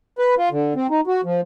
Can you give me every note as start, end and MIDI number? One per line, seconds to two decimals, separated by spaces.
0.19 0.35 71
0.38 0.49 65
0.51 0.73 50
0.76 0.87 60
0.90 1.01 63
1.07 1.21 66
1.24 1.41 53